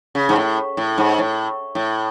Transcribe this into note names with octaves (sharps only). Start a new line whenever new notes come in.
C#3
G#2
A2
A2
G#2
A2
A2